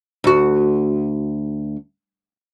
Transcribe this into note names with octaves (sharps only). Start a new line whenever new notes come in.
D2 F#4